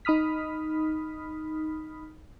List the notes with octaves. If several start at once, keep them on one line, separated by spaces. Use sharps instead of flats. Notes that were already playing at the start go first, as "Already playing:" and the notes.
D#4 B5 D#6 F6 B6